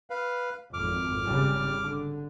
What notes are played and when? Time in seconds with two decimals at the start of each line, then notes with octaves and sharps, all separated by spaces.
0.10 B4 F5
0.74 G#1 F2 D6 F6
1.25 G#1 C#3 G3
1.82 D3